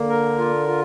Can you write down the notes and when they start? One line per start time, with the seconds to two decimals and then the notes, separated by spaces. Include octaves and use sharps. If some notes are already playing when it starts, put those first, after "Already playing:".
Already playing: D3 A#3
0.09 A#4
0.38 F4
0.67 F4